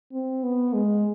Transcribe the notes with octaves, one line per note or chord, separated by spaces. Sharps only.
C4
B3
G#3